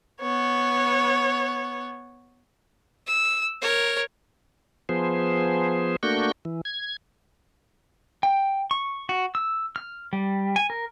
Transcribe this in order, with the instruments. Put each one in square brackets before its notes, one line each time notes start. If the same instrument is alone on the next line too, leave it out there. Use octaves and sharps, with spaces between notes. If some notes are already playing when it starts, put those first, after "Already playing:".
[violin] B3 C#5
[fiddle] E6
A#4 C#5
[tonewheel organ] F3 B3 G#4 C5
A3 A#3 D4 F#4 C#6 G6
E3
G#6
[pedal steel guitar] G5
C#6
F#4
E6
F6
G3
G#5
A#4